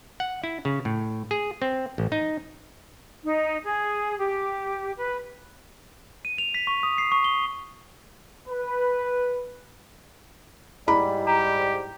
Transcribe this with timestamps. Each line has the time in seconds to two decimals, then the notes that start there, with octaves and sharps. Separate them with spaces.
0.20 F#5
0.44 E4
0.65 C#3
0.85 A2
1.31 G#4
1.62 C4
1.98 A1
2.12 D#4
3.24 D#4
3.64 G#4
4.18 G4
4.97 B4
6.25 D#7
6.38 F7
6.54 B6
6.67 C#6
6.83 D#6
6.98 C7
7.12 C#6
7.24 G7
8.48 B4
10.88 G#2 G3 E4 G#4 B5
11.27 G4 A#5